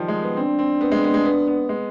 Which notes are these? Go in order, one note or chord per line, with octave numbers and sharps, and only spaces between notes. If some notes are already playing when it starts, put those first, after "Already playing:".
Already playing: D#3 F3 G3
G#3
B3
C4 D4
C4
B3
G#3
B3
G#3
B3
B3
G#3